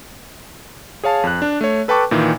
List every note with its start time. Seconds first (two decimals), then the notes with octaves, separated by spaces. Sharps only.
1.04 G#4 C#5 F5 A5
1.24 F2 F#6
1.42 D4
1.61 A3 C#5
1.88 A4 B4 G5 A5 C#6 D6
2.11 A#2 D#3 E3